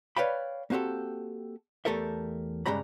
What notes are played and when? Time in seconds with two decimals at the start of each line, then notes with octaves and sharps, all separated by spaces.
0.17 B4 C#5 D5 F5 G5 B5
0.70 A#3 C4 F#4 G4 A4
1.85 E2 A3 G4 A4 A#4 E5
2.66 G2 C#3 G#3 G4 A#5 B5